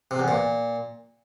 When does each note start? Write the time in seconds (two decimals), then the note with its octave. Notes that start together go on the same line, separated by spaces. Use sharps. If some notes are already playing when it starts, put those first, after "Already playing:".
0.11 C3
0.19 E2
0.28 A#2